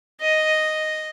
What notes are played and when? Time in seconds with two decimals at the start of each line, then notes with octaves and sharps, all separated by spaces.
0.21 D#5